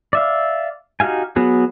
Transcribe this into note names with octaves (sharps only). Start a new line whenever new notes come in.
D5 E5 F5
D#4 F#4 G4 F5 G#5
F#3 B3 F#4 G#4